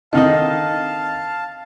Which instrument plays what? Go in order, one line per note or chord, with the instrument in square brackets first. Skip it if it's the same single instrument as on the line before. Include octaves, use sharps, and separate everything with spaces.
[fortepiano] D3 D#3 D#4 [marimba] C4 D#5 [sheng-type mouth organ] F5 A5